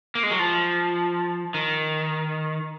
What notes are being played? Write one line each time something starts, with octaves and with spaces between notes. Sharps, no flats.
A#3
G#3
F#3
F3
D#3